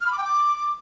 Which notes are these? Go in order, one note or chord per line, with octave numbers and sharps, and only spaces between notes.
F6
B5
D6
G5
D6